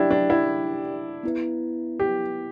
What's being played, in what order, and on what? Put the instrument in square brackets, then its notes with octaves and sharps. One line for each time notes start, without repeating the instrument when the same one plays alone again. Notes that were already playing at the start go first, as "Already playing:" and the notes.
Already playing: [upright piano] D4 E4 [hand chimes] G4 D5 G5
[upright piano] D4
E4
[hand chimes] B3 E4 B4
[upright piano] G4